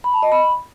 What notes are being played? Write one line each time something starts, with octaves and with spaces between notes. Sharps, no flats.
B5
A5
D#5
B5